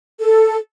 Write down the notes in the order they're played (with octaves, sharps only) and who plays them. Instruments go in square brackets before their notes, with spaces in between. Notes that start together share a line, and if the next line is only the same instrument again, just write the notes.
[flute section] A4